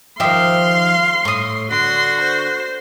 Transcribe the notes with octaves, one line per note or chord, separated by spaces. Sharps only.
D#3 F3 D#4 G4 E5 F5 C6
A2 C#6 D#6
D3 F#4 C6
C5